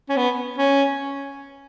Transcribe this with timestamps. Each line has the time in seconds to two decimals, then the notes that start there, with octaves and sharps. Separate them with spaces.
0.09 C#4
0.17 B3
0.58 C#4